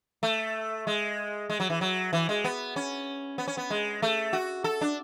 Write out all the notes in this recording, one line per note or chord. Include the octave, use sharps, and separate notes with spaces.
A3
G#3
G#3
F#3
E3
F#3
E3
G#3
B3
C#4
B3
C#4
B3
G#3
A3
F#4
A4
D4